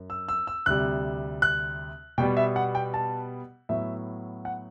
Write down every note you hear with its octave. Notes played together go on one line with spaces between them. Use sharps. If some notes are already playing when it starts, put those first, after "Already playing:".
Already playing: F#2
E6
E6
E6
D2 C3 G3 F#6
F#6
B2 G3 B3 G5
E5
F#5
G5
A5
A2 F#3 B3 E5
F#5